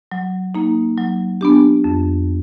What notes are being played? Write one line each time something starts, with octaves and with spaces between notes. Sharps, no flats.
F#3
A#3 D#4
F#3
B3 D4 G4
F2